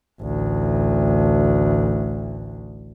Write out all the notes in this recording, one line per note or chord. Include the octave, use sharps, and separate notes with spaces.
A1 D2